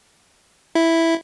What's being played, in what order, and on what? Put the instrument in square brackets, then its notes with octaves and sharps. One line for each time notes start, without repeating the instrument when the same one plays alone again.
[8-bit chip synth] E4